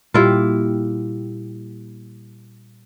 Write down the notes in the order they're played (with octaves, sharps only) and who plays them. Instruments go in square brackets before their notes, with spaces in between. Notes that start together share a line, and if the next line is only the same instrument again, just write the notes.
[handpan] A#2 G3 G4 [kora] E4 F4